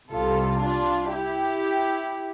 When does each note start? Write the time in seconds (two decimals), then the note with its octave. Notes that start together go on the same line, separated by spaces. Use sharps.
0.10 C2 C3 G3 F4 A4
0.59 D4 F4
1.09 E4 G4